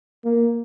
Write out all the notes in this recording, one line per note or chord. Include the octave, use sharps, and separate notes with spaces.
A#3